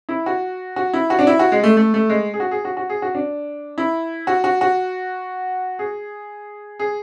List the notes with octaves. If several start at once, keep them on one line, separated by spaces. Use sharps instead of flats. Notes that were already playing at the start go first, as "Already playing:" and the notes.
E4
F#4
F#4
E4
F#4
D4
E4
F#4
G#3
A3
A3
A3
G#3
G#4
F#4
G#4
F#4
F#4
G#4
F#4
D4
E4
F#4
F#4
F#4
G#4
G#4